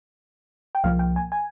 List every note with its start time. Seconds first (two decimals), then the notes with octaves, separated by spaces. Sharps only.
0.75 G5
0.84 C2 A#2 F3 A#3 F5
0.99 G5
1.16 G#5
1.32 G#5